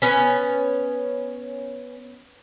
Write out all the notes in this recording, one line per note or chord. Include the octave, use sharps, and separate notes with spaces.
B3 C#4